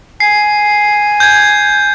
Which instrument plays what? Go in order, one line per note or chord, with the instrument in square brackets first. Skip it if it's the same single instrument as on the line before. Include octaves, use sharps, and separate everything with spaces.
[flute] G#5 [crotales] C7
[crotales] G6 G#6